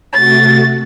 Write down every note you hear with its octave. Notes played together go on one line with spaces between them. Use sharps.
C3 A3 F#4 A6